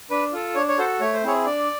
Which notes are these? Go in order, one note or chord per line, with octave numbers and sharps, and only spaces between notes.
D4 B4
F4 A4
D4 C#5
C#5
F#4 A4 C5
A3 C#5
C5
C4 E4 G#4 C#5
D4 D5